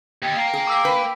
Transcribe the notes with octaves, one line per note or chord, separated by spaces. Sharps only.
D#2 G5
F5 A#5
G#4
D6 E6 B6
B4